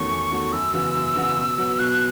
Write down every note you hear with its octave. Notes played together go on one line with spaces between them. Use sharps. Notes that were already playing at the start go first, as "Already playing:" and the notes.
Already playing: E2 D#3 A3 C#4 F#4 C#6
E2
D#3 A3 C#4 F#4
F#2 E6
C#3 E3 B3 F#4
F#2
C#3 E3 B3 F#4
B2
F#3 B3
B2 F#6